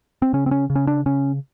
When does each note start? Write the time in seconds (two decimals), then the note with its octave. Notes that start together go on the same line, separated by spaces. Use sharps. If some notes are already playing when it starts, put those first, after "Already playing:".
0.22 C4
0.33 C#3 C#4
0.46 C4
0.51 C#4
0.70 C#3
0.75 C#4
0.87 D4
1.06 C#3 C#4